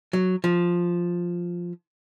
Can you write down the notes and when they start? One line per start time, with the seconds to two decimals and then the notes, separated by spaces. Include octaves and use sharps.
0.13 F#3
0.44 F3